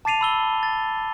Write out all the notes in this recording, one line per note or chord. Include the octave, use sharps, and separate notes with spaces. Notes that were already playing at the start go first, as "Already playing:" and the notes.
A5 D6 A6 C7 D#7 F7
B5 E6 G7
A6